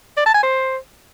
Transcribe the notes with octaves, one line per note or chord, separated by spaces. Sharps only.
D5
A5
G#5
C5